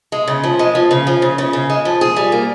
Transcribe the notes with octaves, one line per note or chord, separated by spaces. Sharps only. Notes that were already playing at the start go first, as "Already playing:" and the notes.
G#3
C#3
F3
G#3
F3
C#3
F3
C#3
C#3
C#3
G#3
F3
G#4
G3
A#3